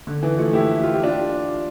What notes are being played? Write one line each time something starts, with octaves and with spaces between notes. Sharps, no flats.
D3
E3
F3 A3
E4 G4
F4
G4
D4 F4